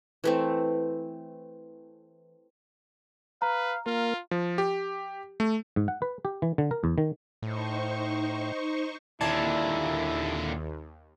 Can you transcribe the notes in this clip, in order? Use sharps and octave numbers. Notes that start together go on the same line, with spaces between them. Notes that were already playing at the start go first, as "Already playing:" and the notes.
E3 A3 C4
B4 F5 A#5
A#3 F4 A#4
F3
G4
A3
G#2
F#5
B4
G4
E3
D3
A#4
E2
D#3
A2 D#4 C5 C#6
D#2 A#2 D3 E4 D5 A5 G#6